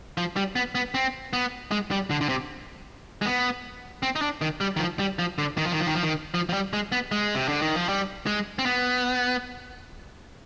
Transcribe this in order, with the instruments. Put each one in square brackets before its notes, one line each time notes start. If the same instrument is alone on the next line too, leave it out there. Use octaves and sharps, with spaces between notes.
[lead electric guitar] F3
G3
B3
B3
C4
B3
G#3
G3
D3
D3
C3
G#3
B3
C4
D#4
D4
D#3
G3
D#3
F3
G3
F3
D3
D#3
F3
D#3
F3
D#3
F3
D#3
F3
F3
G3
G#3
B3
G#3
C3
D3
D#3
F3
G3
G#3
C4
B3